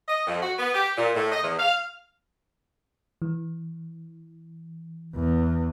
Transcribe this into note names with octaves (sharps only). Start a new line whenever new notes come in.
D#5
F2
F#4
B3
G4
A#2
A2
D#5
E2
F5
E3
E2